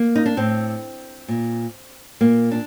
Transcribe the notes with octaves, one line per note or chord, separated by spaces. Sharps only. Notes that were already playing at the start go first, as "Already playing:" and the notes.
Already playing: A#3
D#4
D4
A2 C4
A#2
A#2 A#3
D4